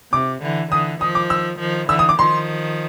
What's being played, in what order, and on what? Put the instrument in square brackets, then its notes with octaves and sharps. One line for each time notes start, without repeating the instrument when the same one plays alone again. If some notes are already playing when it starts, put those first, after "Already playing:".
[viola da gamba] C3 [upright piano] D6
[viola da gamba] D3 E3
[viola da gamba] D3 E3 [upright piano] D#6
[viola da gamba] D#3 F3 [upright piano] D#6
[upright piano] D6
E6
[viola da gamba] D#3 F3
[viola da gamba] D3 E3 [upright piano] E6
[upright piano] D#6
D6
[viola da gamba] D#3 F3 [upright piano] C6